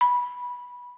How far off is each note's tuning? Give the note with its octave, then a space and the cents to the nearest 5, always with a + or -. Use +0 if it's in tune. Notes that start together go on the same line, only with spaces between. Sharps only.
B5 -15